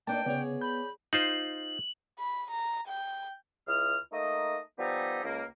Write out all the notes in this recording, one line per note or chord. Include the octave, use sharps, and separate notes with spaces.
A#3 D4 D#4 G5 A5
C#3 B3 G#4 C#5 D5
B5 G6
D#4 F4 C5 F#7
B5
A#5
G5
C#2 E4 D#6 F6
A3 A#3 D#4 D#5
F3 G3 B3 D#4 G4 A4
C#2 A#3